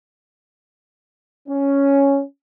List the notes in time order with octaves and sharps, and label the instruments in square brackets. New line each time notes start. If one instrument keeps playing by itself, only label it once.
[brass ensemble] C#4